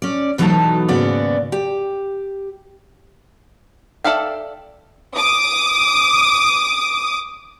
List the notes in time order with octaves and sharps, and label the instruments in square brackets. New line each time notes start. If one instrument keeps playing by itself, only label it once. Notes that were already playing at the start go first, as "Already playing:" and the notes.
[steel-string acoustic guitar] C#4 D5
B2 E3 F#3 A3 D#4 A5
D#2 G#2 C#3 B3 F#4 D5
G4
[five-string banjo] A4 D5 E5 F5 G5
[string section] D6 D#6